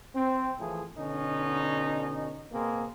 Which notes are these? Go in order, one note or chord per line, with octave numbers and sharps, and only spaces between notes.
C4
A2 E3 F3 G#4
B2 D3 C#4 D#4
B2 A#3 C4 G#4